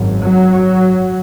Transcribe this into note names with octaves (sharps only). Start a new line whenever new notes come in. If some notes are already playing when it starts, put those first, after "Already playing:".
Already playing: G#1 F#2
F#3